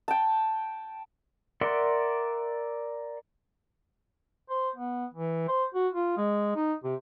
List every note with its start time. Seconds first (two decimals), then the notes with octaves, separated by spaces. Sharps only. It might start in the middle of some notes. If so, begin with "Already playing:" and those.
0.08 G5 A5
1.61 A#4 D5 E5 F#5 C6
4.50 C5
4.76 B3
5.14 E3
5.48 C5
5.74 F#4
5.94 F4
6.17 G#3
6.55 D#4
6.84 C3